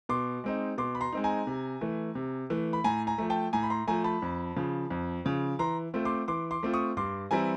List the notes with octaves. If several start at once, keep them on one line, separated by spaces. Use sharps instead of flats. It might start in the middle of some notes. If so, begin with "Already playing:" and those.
B2 C6 D6
G#3 C4 D#4
B2 C6 D6
B5
A#5 C6
G#3 C4 D#4
G#5 A#5
C3
E3 A3
C3
E3 A3
B5
A2 G#5 A#5
G#5 A#5
F3 A3
G5 A5
A2 G#5 A#5
B5
A#5 C6
F3 A3 G#5 A#5
A5 B5
F2
C#3 F3
F2
C#3 F3
E3 A#5 C6
A3 C4 F4
C6 D6
E3 C6 D6
C6 D6
A3 C4 F4
C#6 D#6
G2 C6 D6
E3 G3 C4 E4 G#5 A#5